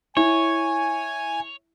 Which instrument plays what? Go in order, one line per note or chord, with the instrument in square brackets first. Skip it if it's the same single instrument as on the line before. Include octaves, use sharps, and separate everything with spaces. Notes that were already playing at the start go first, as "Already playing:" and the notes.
[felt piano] E4 [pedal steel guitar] C#5 [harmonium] G#5